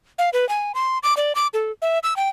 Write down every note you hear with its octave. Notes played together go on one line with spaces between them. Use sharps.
F5
B4
G#5
C6
D6
D5
D6
A4
E5
E6
G5